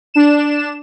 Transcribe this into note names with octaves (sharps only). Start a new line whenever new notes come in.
D4 E7